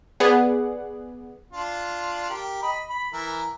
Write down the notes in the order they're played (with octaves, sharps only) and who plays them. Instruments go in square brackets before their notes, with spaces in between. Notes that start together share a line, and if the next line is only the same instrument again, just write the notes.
[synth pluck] B3 G#4 D5 F#5
[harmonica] D4 F4
G4 A#4
D#5 B5
B5
E3 A#4